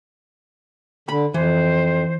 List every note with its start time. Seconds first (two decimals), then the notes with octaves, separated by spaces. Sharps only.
1.09 D3 B5
1.34 F2 E3 C5